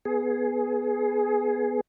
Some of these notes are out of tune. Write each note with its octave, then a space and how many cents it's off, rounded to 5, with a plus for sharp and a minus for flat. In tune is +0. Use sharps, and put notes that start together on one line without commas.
B3 +0 G#4 +15